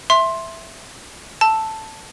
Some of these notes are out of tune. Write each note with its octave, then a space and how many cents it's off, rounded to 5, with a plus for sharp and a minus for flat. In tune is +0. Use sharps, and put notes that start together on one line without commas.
E5 +0 C6 +15
A5 +0 E6 +0